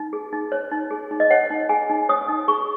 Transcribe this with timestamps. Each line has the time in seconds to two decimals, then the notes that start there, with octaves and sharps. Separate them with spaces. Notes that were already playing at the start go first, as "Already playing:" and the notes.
Already playing: D#4
0.13 G#4
0.33 D#4
0.52 C#5
0.72 D#4
0.91 G#4
1.11 D#4
1.20 D#5
1.31 C#5 F#5
1.50 D#4
1.69 G#4 G#5
1.89 D#4
2.09 C#5 D#6
2.28 D#4
2.48 G#4 C#6